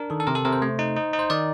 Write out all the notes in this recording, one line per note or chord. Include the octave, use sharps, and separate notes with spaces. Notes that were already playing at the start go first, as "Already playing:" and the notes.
Already playing: D4 A#4
D#3 A4
A4
C3 A#4
A4
C3 A#4
C5
A3
D#4
D#4
D#4
C5
D#3 D5